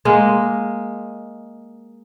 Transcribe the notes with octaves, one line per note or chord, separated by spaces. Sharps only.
G#3 A#3